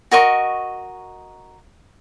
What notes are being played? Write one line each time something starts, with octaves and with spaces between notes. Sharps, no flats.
F#4 A#4 D#5 C#6